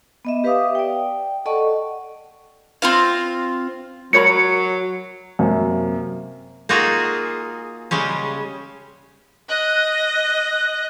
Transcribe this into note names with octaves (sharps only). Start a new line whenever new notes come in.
B3 D#5 E5
G4 B4 E5 F5 D6 D#6
D5 G5
A4 D5 D#5 F#5 A5 C#6
C4 F4 F5
F#3 A#4 C#5 B5 C#7
F#2 C3 A#3
A#3 D#4 F4 F#4 G#4
C#3 G3 G#3 C#4
D#5 F#6